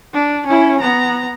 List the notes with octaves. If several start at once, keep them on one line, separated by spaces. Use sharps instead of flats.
D4
C#4 E4
B3 A#5